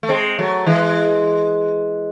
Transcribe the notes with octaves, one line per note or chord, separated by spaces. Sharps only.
A3
G#3 C4
F#3 A3
E3 G#3